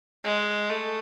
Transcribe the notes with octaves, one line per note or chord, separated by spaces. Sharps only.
G#3
A3